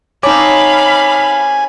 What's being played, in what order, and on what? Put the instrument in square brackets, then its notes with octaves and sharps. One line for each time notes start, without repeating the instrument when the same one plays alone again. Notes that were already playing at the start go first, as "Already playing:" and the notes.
[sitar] C4 C#5 [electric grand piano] D#4 A5 D6 [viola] F5 B5 [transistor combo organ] G#5